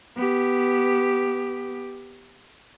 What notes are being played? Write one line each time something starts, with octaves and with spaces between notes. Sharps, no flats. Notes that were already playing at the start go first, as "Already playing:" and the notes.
B3 G4